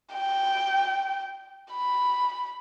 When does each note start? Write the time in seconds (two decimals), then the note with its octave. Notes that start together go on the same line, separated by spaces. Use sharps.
0.14 G5
1.73 B5